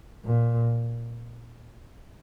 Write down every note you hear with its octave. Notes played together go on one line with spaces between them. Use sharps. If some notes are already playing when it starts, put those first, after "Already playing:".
A#2